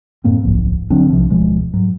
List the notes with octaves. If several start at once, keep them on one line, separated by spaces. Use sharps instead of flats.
F#2 A2 A#3 C4
D1 B1 G#2 F3
D3 F#3 C4 D4
B1 C3 F3
D1 B2 F3 G#3
G#2 F#3